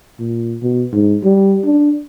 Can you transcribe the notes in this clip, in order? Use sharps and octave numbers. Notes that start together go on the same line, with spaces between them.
A#2
B2
G#2
G3
D4